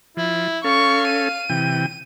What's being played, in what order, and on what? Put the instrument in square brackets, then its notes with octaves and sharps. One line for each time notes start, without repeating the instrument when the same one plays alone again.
[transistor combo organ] F3 [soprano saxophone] E4
[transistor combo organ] C#4 A4 [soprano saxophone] F5 [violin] C#6
[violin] D#7
[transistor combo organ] C3 E3 G5